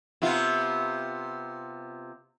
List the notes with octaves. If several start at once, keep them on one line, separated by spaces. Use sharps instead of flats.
C3 B3 F4